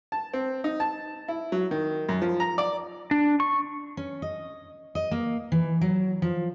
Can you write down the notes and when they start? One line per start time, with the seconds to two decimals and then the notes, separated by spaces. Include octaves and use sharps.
0.12 A5
0.34 C4
0.64 D#4
0.80 A5
1.28 E4
1.52 F#3
1.71 D#3
2.09 F#2
2.22 F3
2.40 A#5
2.58 D5
3.11 D4
3.40 C#6
3.97 C#4
4.22 D#5
4.95 D#5
5.11 A#3
5.52 E3
5.81 F#3
6.22 F3